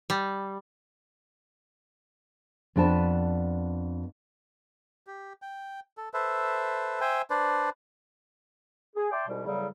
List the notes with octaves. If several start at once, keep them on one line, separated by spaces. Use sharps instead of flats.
G3
F2 B3 D4 B4 A5
G4
G5
A4
A4 B4 C5 E5
C5 E5 G5 G#5
D4 B4 C5 D5
G#4
D5 E5 G5 A5 C6 D6
C2 G#2 B2 G3
E2 A2 C#3 F#3 G3